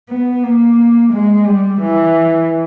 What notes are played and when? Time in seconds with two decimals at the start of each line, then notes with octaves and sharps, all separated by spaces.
0.09 B3
0.43 A#3
1.12 G#3
1.46 G3
1.81 E3